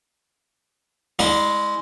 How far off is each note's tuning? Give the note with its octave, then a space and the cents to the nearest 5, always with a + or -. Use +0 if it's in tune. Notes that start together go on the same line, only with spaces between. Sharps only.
G#3 +0 E4 -30 D5 +35